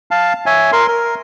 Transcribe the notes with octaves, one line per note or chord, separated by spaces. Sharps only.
F5 A5
C#5 E5 G#5
A#4 C6
A#4